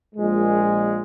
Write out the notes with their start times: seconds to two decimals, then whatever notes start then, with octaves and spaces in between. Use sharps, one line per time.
0.15 A#1 A#2 G#3